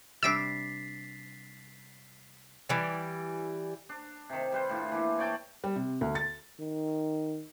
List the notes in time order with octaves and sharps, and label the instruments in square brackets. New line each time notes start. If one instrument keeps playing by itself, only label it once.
[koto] C3 G3 D4 [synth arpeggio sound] E6 D7 [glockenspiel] A6 B6 C7
[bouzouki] E3 G3
[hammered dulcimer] D4
C3 D#3
G3 B4 C5
A2 D4 F4
E3 A#3
C#5 D5 G5 A5
[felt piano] G3
C3
D2
A6
[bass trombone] D#3